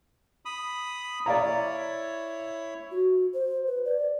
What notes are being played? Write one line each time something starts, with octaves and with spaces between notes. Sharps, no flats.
B5 D#6
E4 C#5 D5 F5 A#5
F#4
C5
B4
D5